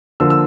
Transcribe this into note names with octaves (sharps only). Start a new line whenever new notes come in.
D3 F3 A#3 E6
E6